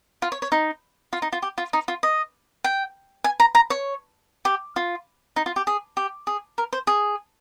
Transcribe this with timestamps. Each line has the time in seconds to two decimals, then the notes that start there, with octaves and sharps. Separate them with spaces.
0.22 F4
0.32 C#5
0.42 C#5
0.52 D#4
1.13 F4
1.22 D#4
1.32 F4
1.42 G4
1.58 F4
1.73 D#4
1.88 F4
2.03 D#5
2.64 G5
3.24 G#5
3.40 A#5
3.55 A#5
3.70 C#5
4.45 G4
4.76 F4
5.36 D#4
5.46 F4
5.56 G4
5.67 G#4
5.97 G4
6.27 G#4
6.58 A#4
6.73 C5
6.87 G#4